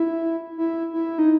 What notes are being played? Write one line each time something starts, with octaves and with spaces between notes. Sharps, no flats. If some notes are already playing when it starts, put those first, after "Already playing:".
Already playing: E4
E4
E4
D#4